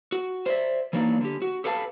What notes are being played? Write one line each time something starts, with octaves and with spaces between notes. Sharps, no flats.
F#4
C5 D5 E5
E3 F#3 A#3 D4 D#4
D3 G4
F#4
G4 A4 B4 F5 G#5 A5